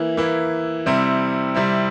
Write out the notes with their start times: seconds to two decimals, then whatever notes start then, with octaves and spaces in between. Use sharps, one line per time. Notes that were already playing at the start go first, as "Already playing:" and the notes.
Already playing: E3 A#3 E4
0.17 E3 A#3 E4
0.86 C3 G3 C4 E4
1.54 C3 G3 C4 E4